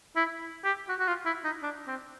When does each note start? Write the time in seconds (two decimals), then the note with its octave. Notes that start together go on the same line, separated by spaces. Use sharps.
0.16 E4
0.64 G4
0.89 F#4
0.99 F#4
1.07 F4
1.26 E4
1.44 D#4
1.63 D4
1.87 C4